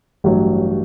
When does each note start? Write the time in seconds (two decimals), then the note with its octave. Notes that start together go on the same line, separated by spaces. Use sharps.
0.24 A1 G2 F#3